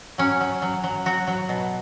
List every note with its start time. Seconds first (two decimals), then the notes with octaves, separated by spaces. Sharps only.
0.18 F#3 C#4
0.41 F#3
0.62 F#3
0.84 F#3
1.06 F#3 F#4
1.27 F#3
1.49 B2